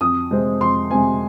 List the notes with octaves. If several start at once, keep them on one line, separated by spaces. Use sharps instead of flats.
F2 D#6
C3 G#3 C4
F2 C6
C3 G#3 C4 G#5